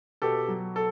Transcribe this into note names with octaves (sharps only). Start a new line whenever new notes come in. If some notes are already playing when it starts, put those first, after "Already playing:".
B2 G4 A4
F#3
A4